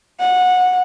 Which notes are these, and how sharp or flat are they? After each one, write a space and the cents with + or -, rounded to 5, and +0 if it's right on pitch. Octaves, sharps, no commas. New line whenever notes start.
F#5 -20